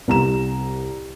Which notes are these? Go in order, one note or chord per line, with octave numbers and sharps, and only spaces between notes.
C2 A#5 E7